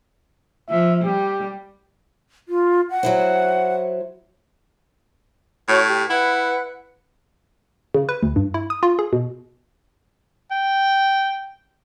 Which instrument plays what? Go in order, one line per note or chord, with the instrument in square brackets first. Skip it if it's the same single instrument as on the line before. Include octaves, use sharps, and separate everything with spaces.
[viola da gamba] F3 [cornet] E5
[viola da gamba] G3 [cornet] G4
[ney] F4
F#5
[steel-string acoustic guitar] F#3 E4 C5
[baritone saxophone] A2 [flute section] F#4 C#5
[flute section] G4
[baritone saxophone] E4 [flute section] B4 F#5 F#6
[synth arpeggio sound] C#3
B4
D2
G2
E4
D#6
F4
G#4
B2
[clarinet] G5